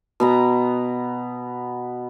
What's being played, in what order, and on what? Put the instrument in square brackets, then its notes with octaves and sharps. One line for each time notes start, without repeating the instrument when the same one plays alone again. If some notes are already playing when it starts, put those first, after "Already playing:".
[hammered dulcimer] B2 B3 A#5